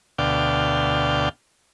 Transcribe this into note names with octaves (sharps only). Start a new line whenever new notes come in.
D2 B2 D5 F5 G5